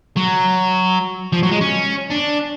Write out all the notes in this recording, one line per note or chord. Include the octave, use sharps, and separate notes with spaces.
F#3
F3
F#3
G#3
C#4
D4